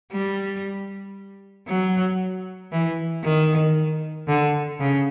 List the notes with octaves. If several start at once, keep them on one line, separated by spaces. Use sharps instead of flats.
G3
F#3
E3
D#3
D3
C#3